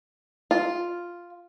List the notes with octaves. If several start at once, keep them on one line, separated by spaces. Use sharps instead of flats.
F4